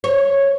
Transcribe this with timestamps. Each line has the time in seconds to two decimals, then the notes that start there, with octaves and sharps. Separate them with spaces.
0.04 C#5